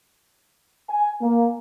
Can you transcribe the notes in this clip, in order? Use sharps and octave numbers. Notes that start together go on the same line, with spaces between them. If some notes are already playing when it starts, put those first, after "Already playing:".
G#5
A#3